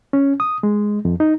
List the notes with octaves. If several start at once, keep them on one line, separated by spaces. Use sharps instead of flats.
C#4
D#6
G#3
F2
D#4